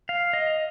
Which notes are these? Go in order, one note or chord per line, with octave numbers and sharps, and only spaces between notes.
F5
D#5